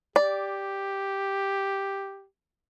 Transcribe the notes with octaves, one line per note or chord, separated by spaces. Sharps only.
G4 D5